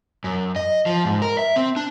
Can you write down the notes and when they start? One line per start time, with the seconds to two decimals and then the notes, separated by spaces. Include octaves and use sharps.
0.24 F#2
0.56 D#5
0.86 F3
1.05 G#2
1.22 A#4
1.39 E5
1.56 C4
1.76 D4